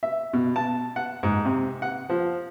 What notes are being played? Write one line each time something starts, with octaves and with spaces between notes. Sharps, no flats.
E5
B2
A5
F#5
G#2
C3
F#5
F3